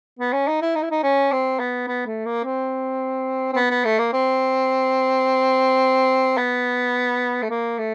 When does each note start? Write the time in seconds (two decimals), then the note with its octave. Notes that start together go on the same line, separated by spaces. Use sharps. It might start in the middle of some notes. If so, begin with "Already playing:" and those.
0.19 B3
0.33 C#4
0.47 D#4
0.61 E4
0.75 D#4
0.82 E4
0.90 D#4
1.03 C#4
1.32 C4
1.59 B3
1.87 B3
2.06 A3
2.25 A#3
2.44 C4
3.53 C4
3.56 B3
3.71 B3
3.85 A3
3.99 A#3
4.13 C4
6.37 B3
7.43 A3
7.50 A#3
7.78 A3